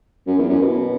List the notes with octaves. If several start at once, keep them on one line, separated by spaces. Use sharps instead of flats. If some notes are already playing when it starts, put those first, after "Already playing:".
F#2
E2
F#2
B2